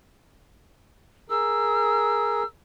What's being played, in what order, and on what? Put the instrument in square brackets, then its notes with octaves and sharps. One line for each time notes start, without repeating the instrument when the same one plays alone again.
[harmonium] G#4 A#4 [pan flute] E6